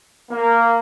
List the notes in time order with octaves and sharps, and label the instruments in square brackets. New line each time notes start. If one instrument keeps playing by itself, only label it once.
[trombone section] A#3